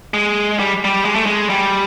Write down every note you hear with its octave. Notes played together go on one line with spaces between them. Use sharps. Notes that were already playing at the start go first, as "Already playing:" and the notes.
G#3
G3
G3
G#3
A3
G#3
G3